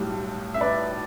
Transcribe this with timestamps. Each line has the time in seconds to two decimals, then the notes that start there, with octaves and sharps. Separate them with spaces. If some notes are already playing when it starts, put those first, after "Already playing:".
Already playing: B1 A2 G3
0.54 E5
0.61 B4 D5